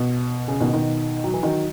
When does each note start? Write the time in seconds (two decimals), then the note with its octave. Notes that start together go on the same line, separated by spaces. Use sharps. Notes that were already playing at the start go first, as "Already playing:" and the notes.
Already playing: B2
0.48 C#3
0.60 B2 D#3
0.73 B2 D#3
1.24 F#3
1.34 E3
1.43 D#3 F#3